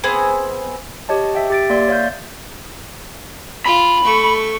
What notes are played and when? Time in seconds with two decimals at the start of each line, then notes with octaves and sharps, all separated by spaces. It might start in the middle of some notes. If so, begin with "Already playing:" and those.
0.04 B3 C4 G#4 C5
1.09 G4 C#5 D#5 A5
1.35 E5 G5
1.50 G4 A6 D7
1.70 A#3 D5 E5 C6 A6
1.88 C#5 F5 G6
3.66 F4 B5
4.03 A3 C#6